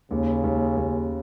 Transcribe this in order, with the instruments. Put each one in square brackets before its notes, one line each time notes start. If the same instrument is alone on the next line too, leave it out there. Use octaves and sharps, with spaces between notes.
[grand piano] D#2 [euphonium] C#3
[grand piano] D#2
D#2